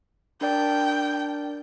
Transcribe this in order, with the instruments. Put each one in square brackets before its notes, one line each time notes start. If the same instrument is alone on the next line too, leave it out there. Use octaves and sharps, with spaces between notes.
[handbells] D4 A#4 D5 [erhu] G5